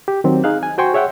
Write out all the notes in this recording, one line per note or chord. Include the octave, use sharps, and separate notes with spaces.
G4
D#3 F#3 C4
D#4 G#4 F5 F#6
G#5
F#4 C5 G5 G#5 C6 C#6
G#4 C#5 E5 F#5 G5